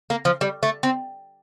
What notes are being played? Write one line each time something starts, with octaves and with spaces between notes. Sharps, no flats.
A#3
F3
G3
A3
C4